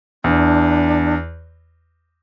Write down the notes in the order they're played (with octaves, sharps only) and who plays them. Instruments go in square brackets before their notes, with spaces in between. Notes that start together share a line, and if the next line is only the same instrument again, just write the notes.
[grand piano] E2 [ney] D4